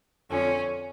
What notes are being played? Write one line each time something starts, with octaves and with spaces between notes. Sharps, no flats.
F2 D3 F3 C#4